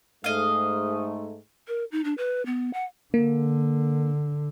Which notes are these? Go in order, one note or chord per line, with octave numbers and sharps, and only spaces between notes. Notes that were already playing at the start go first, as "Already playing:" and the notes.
G#2 A3 D#5 F5
A#4
D#4
D4
B4
B3
F#5
D3 A#3